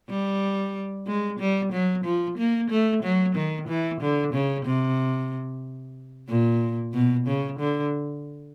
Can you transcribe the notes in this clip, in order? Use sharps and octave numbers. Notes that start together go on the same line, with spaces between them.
G3
G#3
G3
F#3
F3
A#3
A3
F#3
D#3
E3
D3
C#3
C3
A#2
B2
C#3
D3